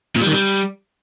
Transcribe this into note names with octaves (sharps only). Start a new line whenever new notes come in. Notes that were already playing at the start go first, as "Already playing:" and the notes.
A#2
G3
D#3
G3